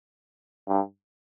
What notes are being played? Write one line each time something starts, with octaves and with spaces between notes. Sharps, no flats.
G2